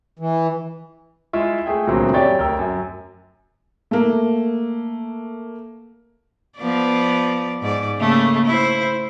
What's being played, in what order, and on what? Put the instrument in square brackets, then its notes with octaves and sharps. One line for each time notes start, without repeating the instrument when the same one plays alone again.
[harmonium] E3
[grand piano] G#3 E4 F4 E5
A3 G#4 G5
C#2 A#2 D3 F#3 A3 C4
F#2 G4 C#5 D5 G5 A6
D2 A#4 G5 E6
F#2
[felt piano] A3 A#3
[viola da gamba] F3 B3 D5
G#2 D5
C#3 A3 A#3
E4 C5